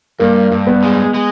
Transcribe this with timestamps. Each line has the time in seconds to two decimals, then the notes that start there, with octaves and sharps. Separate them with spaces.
0.19 G2 A#3
0.52 G2
0.67 B3
0.83 G#3
1.14 G#3